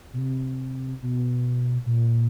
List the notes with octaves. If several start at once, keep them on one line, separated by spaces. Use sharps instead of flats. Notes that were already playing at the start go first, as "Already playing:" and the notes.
B2
C3
B2
A#2